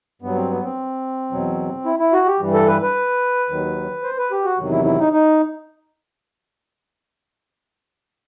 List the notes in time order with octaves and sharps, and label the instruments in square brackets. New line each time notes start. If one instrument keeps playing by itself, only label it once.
[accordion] G2 F#3 B3
C4
B3
C4
E2 B2 F#3
E4
E4
F#4
G4
G2 E3 G3
A4
B4
B4
D#2 D#3 F#3
C5
B4
G4
F#4
E2 C3 D#3 F#3
E4
E4
D#4
D#4